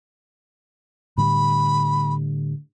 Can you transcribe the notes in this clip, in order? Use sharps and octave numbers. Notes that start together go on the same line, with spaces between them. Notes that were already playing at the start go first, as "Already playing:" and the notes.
A2 D3 G3 B5